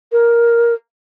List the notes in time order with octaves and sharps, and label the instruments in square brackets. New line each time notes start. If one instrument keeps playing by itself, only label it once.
[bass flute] A#4